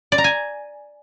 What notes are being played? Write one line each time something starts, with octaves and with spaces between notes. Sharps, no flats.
D5
A#5
G#5